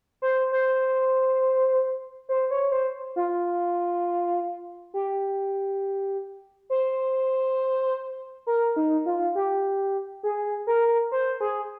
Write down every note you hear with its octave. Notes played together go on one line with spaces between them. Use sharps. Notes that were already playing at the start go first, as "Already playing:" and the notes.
C5
C5
C5
C#5
C5
F4
G4
C5
A#4
D#4
F4
G4
G#4
A#4
C5
G#4